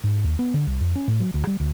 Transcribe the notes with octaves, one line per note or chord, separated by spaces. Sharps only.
G#2
D#2
B3
D3
C2
F2
C#4
A2
F#3
D2
G3
D2